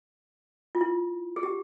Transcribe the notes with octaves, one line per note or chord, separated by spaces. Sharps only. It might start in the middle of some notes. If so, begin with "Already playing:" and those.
F4
E4
G#4
G4